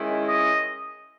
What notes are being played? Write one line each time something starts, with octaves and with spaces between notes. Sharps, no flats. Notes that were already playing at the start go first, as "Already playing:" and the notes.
Already playing: D#3 G#3 C#4 E4
D#5